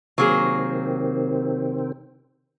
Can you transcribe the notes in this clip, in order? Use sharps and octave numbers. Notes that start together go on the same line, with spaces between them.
C3 D#3 F#3 A#3 C4 G#4